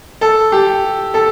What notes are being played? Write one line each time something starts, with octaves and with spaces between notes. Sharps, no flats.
A4
G4
A4